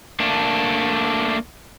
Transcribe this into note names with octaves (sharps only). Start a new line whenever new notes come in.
A3 A#3 D4